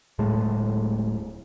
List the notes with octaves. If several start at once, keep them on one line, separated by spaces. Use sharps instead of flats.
D1 A2 G#3 A3